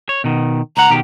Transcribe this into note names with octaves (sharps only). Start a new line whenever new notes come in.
C#5
B2 D#3
C#2 F#5 A#5
B2 D#3 G4